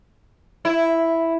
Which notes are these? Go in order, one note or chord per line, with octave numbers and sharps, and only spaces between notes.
E4